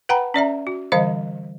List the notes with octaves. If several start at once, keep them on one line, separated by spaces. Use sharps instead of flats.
B4 F#5 G5 A#5 B5
C#4 D5 E5 A#5
F#4
D3 E3 G3 C5 D#5 F5